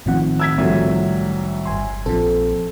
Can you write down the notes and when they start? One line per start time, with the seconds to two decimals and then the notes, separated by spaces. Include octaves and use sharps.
0.06 A1 A2 D#3 F3 C4 F#5
0.40 E6 G#6 B6
0.58 C2 F3 F#3 A3
1.66 G1 G#5 C6
2.06 A#1 F3 C4 A4